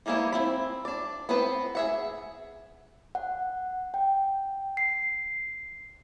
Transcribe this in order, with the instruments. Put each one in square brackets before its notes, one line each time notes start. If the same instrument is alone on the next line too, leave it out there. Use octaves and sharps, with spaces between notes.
[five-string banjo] E3 G3 A#3 B3 E4
C4 E4 B5
D4 D5
B3 C4 B4 C5
G#4 E5 F#5
[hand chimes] F#5
G5
C7